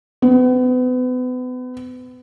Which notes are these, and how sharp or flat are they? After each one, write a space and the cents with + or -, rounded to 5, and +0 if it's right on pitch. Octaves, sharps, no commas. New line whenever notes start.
B3 +35